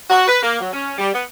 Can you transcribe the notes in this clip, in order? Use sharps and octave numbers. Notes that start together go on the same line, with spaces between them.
F#4
B4
A#3
F#3
C#4
G3
B3